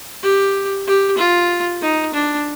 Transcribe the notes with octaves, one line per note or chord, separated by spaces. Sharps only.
G4
G4
F4
D#4
D4